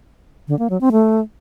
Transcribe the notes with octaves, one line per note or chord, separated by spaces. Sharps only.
D3
A#3
F#3
C4
A3